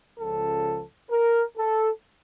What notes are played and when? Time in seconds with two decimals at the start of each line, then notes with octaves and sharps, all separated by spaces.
0.17 C#2 C#3 F3 A4
1.10 A#4
1.56 A4